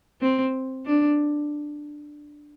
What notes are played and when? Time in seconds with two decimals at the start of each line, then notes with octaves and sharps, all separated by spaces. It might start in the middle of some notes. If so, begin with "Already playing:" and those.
0.21 C4
0.86 D4